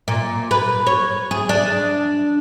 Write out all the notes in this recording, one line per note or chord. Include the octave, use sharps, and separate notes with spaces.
A#2
B4
C#5
G#4
D4